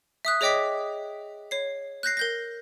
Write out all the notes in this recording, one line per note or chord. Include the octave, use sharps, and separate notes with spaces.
E5 D#6 F#6
G#4 C#5 D#5 G5 D6 B6
C#5 C7
F#6 G6 A#6 C7
A#4 G6 A#6